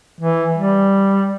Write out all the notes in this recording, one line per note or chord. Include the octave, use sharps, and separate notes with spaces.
E3
G3